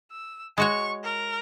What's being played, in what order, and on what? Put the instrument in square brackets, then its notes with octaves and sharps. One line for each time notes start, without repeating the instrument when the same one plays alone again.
[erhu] E6
[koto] G#3 F#4 C#5 [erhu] C#6
[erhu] A#4